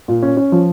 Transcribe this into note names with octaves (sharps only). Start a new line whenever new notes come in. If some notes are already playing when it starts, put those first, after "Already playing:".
A#2
C#4
C#4
F3